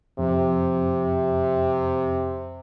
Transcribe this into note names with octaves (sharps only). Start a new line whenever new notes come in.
F2 C3